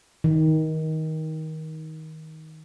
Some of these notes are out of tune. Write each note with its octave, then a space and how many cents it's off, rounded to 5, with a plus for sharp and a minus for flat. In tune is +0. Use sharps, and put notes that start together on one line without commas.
D#3 +20